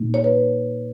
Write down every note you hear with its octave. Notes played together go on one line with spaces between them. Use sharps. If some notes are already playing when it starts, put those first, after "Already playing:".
Already playing: A#2 A#3 D#4
C#5
B4